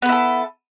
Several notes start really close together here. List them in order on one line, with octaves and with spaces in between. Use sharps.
B3 B4 E4 A4